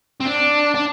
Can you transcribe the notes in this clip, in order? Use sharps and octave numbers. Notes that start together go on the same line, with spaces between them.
C4
D4
D4